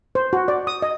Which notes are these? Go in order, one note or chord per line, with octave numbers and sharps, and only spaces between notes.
C5
F#4
D5
D#6
D#5